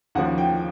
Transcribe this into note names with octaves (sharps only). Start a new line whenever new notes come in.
D#2 C#3 F3 F#5
G5